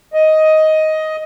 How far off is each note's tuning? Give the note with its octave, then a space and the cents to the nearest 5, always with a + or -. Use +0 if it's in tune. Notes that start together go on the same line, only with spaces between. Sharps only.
D#5 +10